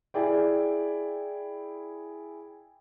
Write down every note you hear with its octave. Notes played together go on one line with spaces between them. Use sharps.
E4 G#4 D5 G5